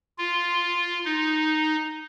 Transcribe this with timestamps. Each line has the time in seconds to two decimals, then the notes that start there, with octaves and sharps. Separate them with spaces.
0.18 F4
1.05 D#4